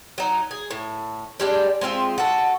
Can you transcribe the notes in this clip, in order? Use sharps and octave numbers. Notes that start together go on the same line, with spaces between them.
F#3 D#4
G#4
A2
G3 G#3 D4
G#3 C4 F4 E5
F#4 A4